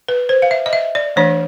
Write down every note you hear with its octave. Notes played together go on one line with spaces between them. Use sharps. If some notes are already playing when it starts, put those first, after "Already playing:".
B4
C5
F5
E5
D#5
E5
D5
E3 A3 D4 C#5